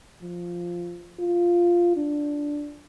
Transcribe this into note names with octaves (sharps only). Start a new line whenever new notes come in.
F3
F4
D4